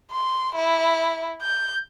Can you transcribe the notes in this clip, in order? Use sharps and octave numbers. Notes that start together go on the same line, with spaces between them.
C6
E4
G6